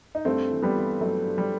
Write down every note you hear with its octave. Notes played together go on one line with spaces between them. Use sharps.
D#4
G2 A3 C4
E3
G3 B3
E3
G2 F#3 A3
G2
G3